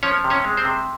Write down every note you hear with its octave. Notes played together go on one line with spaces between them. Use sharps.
F3 C#4 C#5
C3
C#4 C#5
G#3
C4 C5
C3